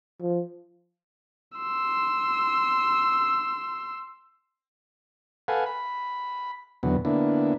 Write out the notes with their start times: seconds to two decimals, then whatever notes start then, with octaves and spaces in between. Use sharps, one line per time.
0.21 F3
1.58 C6 E6
5.48 A4 B4 F5 F#5 G#5
5.66 B5
6.83 E2 B2 D3 F#3 B3
7.05 D3 A#3 B3 D4 E4